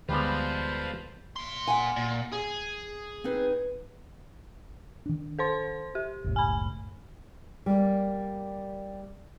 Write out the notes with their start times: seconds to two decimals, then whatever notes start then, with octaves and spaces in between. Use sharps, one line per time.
0.09 D2 G3 G#3 B3 F4 A4 B4 C5
1.36 A#2 C6
1.67 F#5 G#5
1.96 A#2
2.32 G#4
3.24 C4 D#4 B4
5.06 D#3 D4
5.39 A4 C5 C6
5.95 G4
6.24 F#1 C#2 A2
6.36 G#5 B5
7.66 G3 A#3